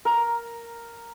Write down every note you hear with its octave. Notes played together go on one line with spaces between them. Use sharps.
A#4